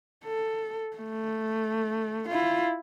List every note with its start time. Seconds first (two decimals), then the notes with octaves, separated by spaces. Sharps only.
0.25 A4
0.97 A3
2.28 E4 F4